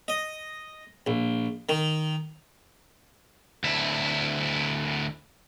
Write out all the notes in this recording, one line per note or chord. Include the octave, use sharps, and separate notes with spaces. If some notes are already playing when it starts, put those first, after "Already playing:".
D#5
A#1
D#3
D2 E4